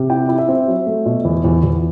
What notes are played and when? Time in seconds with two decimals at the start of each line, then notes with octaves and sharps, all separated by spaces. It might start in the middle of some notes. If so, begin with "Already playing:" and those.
Already playing: C3
0.10 E4 G5
0.29 E4
0.38 E5
0.49 C4
0.68 F#3
0.87 A3
1.06 B2
1.25 E2
1.44 E2
1.64 E2